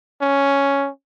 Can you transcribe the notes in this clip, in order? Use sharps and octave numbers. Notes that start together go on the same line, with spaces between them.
C#4